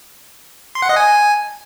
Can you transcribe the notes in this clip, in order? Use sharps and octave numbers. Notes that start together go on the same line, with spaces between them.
C6
F#5
D#5
G#5